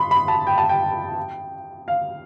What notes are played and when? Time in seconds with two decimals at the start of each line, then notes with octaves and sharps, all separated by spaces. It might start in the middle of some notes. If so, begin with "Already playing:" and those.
Already playing: B5 C6
0.11 B5
0.28 A5
0.47 G5
0.58 A5
0.69 G5
1.88 F5